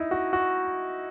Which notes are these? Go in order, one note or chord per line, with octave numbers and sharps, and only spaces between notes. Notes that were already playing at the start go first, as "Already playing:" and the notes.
Already playing: D#4 E4
F#4
F#4